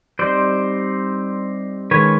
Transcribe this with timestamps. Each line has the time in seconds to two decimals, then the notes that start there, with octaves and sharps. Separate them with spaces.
0.19 G3 C4 D#4 C5 D5
1.91 D#3 G#3 C#4 B4 C#5